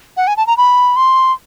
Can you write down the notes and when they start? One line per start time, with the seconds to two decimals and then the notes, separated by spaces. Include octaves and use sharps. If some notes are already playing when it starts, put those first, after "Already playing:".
0.17 F#5
0.27 G#5
0.37 A5
0.47 A#5
0.57 B5
0.96 C6